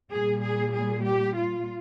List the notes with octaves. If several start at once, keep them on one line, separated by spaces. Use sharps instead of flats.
A#2 G3 G#4
G#4
G#4
G4
F4